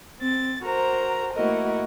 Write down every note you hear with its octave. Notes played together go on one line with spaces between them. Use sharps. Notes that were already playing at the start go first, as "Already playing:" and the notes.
C4 A6
F#4 A#4 C5 A#5
A3 A#3 E4 F#4 A#4 D#5